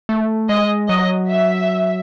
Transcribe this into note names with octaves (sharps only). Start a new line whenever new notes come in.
A3
G#3 D#5
F#3 D#5
E5